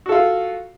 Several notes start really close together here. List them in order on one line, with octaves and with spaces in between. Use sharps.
F#4 A4 F4